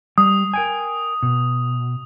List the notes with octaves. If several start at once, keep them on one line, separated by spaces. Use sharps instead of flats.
G3 D#6
A#4 G5 G#5
B2